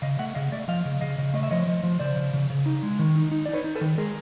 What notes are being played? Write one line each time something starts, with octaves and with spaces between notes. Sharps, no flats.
C#3 D#5 F5
A3 E5 F#5
C#3 D#5 F5
A3 D5 E5
F3 D#5 F5
C#3
C#3 D#5 F5
C#3
A3 D#5
E5
F3 C#5 D#5
F3
F3
C#3 C5 D5
C#3
C#3
C#3
D#4
G#3
D#3
D#4
D#4
D5
D#4 B4 C#5
D#4
A4 B4
D#3
G#3 G#4 A#4